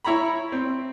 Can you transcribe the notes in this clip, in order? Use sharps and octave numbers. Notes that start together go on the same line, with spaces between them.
E4 C#5 A#5 B5
C4